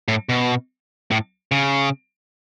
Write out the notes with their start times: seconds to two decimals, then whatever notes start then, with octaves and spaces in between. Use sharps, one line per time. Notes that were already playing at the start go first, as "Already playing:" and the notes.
0.08 A2
0.29 B2
1.11 A2
1.52 C#3